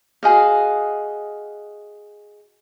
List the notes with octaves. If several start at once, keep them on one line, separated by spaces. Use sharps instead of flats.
F#4 G#4 D#5 F5